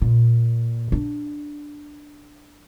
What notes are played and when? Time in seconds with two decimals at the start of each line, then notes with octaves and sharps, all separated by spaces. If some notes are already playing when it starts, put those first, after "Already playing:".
0.02 A#2
0.92 D4